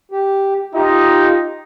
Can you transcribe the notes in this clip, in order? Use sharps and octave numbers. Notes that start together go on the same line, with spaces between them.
G4
D#4 F4 G4